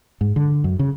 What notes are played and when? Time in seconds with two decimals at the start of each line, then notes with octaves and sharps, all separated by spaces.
0.21 G#2
0.36 D3
0.64 F#2
0.79 C#3